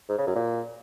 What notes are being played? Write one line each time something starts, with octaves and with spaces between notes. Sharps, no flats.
G#2
C#3
F#2
A#2